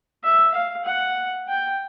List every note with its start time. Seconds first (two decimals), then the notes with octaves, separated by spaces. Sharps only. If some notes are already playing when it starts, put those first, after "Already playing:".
0.24 E5
0.54 F5
0.85 F#5
1.48 G5